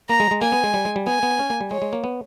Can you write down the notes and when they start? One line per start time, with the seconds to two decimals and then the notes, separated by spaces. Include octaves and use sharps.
0.09 A#3 A#5
0.20 G#3
0.31 G#3
0.42 A#3 G#5
0.52 B3
0.64 G#3
0.74 G3
0.85 G#3
0.96 G3
1.07 B3 G#5
1.23 B3
1.39 C#4
1.50 A#3
1.61 G3
1.71 G#3 C#5
1.82 G#3
1.93 A#3
2.04 B3